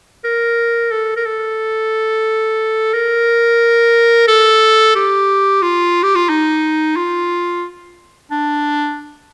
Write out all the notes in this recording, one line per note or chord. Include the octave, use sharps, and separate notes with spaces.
A#4
A4
A#4
A4
A#4
A4
G4
F4
G4
F4
D#4
F4
D4